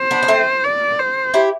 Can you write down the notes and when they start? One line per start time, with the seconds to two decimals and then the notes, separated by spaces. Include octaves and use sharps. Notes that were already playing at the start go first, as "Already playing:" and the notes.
Already playing: C5
0.11 B3 D4
0.23 D4
0.28 A3 C4
0.64 D5
0.99 C5
1.34 E4 G4